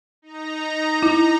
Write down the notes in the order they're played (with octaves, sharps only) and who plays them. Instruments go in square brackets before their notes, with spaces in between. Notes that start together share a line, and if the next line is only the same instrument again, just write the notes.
[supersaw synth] D#4 A#5
[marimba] E4